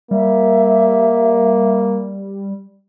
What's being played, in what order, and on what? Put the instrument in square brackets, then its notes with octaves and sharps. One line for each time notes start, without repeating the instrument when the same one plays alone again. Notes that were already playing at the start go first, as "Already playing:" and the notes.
[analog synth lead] G3 [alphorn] A#3 [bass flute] E5